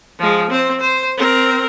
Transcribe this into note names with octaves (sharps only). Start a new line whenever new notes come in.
F3 G#3
C4 C5
C5
C4 A#4